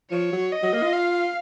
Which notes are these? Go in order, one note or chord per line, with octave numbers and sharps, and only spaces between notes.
F3 C#5
F#3
D#5
F#3
A#3
F4
F5